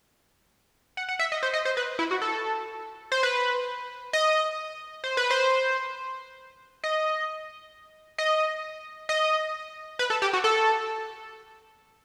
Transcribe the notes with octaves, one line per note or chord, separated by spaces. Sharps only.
F#5
F#5
E5
D#5
C5
D#5
C5
B4
E4
F#4
A4
C5
B4
D#5
C5
B4
C5
D#5
D#5
D#5
B4
A4
G4
F#4
A4